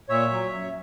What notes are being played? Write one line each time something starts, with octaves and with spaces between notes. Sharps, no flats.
A#2 C#5 E5
F#3
F#2